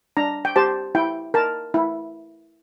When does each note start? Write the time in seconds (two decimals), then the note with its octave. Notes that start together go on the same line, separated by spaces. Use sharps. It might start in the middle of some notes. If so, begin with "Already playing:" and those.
0.17 D4 A#5
0.45 G5
0.56 G4 C5 A5
0.95 E4 G5
1.34 A#4 A5
1.74 E4